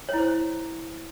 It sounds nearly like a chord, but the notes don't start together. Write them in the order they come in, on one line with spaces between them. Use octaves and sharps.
C#5 E4 C5